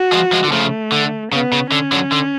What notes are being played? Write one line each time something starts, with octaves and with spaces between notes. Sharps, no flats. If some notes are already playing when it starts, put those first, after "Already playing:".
Already playing: F#4
F3 G#3
F3 G#3
D3
C#3 F3 A3
D3
C#3 B3
C#3
D3 C#4
D3 F#3
D3